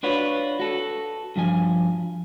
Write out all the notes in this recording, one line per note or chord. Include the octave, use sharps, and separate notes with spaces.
D4 F4 F#4 B4 C#5
F#4 A4
G2 F3 G#5